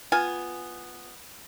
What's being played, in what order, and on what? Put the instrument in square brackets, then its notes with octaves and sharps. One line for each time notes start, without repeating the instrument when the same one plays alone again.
[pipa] B3 F4 G#5